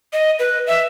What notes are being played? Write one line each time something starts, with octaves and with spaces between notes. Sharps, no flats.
D#5
B4
E5